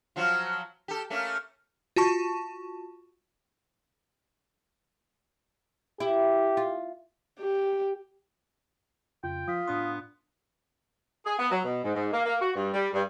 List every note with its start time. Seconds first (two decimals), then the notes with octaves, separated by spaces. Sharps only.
0.16 F3 F#3 F4
0.88 G4 A4
1.10 A3 A#3 C#4
1.96 F4 F#4 A5 C#6
6.00 E4 G4
6.57 F4
7.39 G4
9.24 F2 C#3 F4 G5
9.48 F3 F4 D#6 B6
9.68 A2 B3 D4 C6
11.26 G#4
11.39 B3
11.51 F#3
11.65 B2
11.84 G#2
11.96 G#2
12.13 A#3
12.26 A#3
12.42 F#4
12.55 G2
12.74 G3
12.94 G2